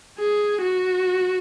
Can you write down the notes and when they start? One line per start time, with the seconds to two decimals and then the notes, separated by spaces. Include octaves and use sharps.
0.19 G#4
0.61 F#4